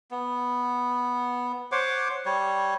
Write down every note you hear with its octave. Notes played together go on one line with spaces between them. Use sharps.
B3
C5 C#5 F#5 D6
G3 C#5